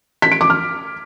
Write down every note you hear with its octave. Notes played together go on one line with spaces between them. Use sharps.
B6
D7
D6
F6